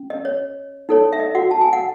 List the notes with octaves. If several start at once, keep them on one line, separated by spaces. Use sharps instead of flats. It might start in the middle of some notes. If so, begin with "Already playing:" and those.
Already playing: C#4
D#5
C#5
D#4 A4 C#5
E5
D#5
F#4 F#5
A5
G#5
F#5